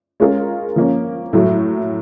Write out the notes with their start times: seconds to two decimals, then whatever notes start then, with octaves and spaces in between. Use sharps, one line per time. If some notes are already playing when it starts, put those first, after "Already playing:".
0.20 G#3 C#4 F4 A#4
0.76 F3 A#3 C#4
1.33 A2 F#3 A3